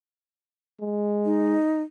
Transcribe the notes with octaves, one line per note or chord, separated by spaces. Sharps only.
G#3
D#4